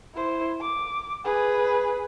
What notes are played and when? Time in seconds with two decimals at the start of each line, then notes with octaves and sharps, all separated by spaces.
0.15 E4 C5
0.61 D6
1.24 G#4 B4